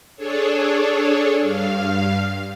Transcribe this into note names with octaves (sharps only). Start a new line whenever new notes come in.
D4 G#4 A4 C#5
G2 F5